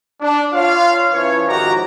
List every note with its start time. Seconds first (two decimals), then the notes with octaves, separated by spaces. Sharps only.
0.21 D4
0.54 F4 C#5 F5
1.13 F3 C#4 E4 B4 C#5
1.47 G#2 D#3 F3 F#4 G4 A#5